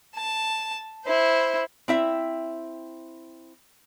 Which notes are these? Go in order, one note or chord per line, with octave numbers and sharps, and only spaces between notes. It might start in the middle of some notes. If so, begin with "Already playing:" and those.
A5
E4 C5
C4 E4 E5